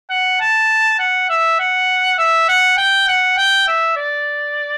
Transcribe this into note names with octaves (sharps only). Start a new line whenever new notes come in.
F#5
A5
F#5
E5
F#5
E5
F#5
G5
F#5
G5
E5
D5